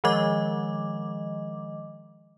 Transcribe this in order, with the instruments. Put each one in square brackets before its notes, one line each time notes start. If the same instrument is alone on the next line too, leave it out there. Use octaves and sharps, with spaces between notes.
[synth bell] D#3 F3 G#3 D#5 D6